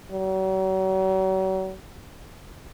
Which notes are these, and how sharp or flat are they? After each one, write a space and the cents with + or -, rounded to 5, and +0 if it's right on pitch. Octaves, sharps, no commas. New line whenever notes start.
F#3 +40